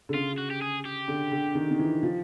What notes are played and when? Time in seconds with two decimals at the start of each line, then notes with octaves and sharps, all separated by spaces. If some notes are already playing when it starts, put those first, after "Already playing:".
0.09 D3
0.14 C#3 F4
0.38 F#4
0.51 G4
0.62 G#4
0.85 G4
1.08 D3
1.32 D3
1.55 D#3
1.71 D#3
1.79 E3
2.03 F3